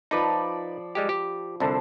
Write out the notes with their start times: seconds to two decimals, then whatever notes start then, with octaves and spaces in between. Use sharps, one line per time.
0.11 F3 D#4 B4 D5 B5
0.95 G3 G#3 G4
1.09 G4
1.60 C2 D3 C5 A5